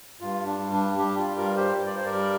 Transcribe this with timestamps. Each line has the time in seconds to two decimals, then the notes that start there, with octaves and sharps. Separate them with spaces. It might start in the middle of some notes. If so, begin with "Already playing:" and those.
0.20 G2 F4
0.46 D4
0.59 G3
0.73 D4
0.98 G3 D4 G4
1.18 F4
1.37 G2 F4 A#4
1.56 G4 C5
1.76 G2
1.86 D5
1.96 C5
2.06 A#4 D5
2.14 G3